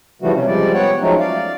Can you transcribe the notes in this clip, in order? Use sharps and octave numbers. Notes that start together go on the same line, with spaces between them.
C#3 E3 F3 G3 A3 F#4
C3 C#4
F3 G3 G#3 D5
B3 C#5 F#5 G5
F3 F#3 G#3 A3 C#4 D#4
D5 F5